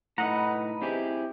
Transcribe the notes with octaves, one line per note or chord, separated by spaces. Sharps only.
A2 A3 D#4 B4 D#5 F#5 A#5
C4 E4 G4 G#4